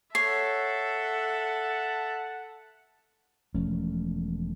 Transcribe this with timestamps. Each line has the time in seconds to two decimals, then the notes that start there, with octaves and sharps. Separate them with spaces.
0.15 A4 C#5 E5 F#5 A5 C7
3.55 E1 F3 A3 C#4